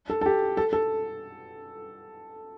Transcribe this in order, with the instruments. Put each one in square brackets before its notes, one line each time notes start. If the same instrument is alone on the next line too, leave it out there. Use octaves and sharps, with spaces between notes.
[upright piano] A4
A4
G4
A4
A4